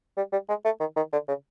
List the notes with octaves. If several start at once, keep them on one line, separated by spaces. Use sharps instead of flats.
G3
G3
G#3
A3
D#3
D#3
D3
C#3